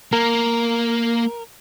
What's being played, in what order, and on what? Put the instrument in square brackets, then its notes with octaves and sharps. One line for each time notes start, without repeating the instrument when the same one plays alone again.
[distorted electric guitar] A#3 [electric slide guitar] A#4